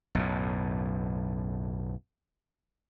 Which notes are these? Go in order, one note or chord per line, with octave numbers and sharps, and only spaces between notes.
B1 F#2 A2